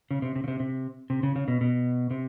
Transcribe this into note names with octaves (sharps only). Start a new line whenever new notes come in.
C#3
C3
C3
C#3
C3
C3
C3
C#3
C#3
B2
B2
C3